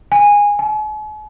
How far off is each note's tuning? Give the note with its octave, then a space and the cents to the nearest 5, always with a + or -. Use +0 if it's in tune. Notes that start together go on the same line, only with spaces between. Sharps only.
G#5 -15
G#5 +45